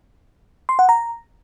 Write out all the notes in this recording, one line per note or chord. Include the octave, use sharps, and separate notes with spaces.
C6
F#5
A#5